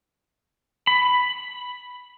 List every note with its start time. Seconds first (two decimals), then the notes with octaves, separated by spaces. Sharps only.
0.87 B5